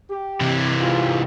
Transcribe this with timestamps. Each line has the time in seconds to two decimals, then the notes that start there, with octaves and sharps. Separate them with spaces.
0.11 G4
0.41 C3 E3
0.82 G#2 F4